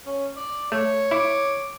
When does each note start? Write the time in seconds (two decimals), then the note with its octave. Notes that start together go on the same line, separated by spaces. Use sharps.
0.06 C#4
0.36 D5
0.72 A3 C#5
1.11 E4 D6